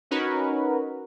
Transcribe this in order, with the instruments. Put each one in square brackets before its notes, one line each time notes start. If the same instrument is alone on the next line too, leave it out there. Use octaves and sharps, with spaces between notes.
[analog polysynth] C#4 D#4 F#4 A#4 B4